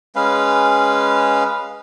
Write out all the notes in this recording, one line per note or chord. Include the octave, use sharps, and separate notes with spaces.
G#3 C#4 B4 F5